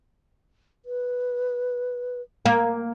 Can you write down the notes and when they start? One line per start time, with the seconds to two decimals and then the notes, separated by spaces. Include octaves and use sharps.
0.85 B4
2.46 A#3